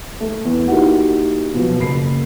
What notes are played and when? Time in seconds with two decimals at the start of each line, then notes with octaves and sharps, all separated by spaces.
0.20 A3
0.45 E2
0.67 A#3 D#4 E4 F#4 G4 F#5
1.54 B2 F3 F#3
1.78 F#1 A#3 B5 C7